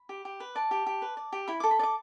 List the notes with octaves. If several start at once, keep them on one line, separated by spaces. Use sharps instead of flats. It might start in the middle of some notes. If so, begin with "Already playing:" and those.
Already playing: B5
G4
G4
B4
D5 A5
G4
G4
B4
D5
G4
E4 B5
A4 D6
B5
D5
D6